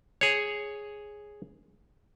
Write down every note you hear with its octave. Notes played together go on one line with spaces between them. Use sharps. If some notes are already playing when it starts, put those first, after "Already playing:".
G#4 C#5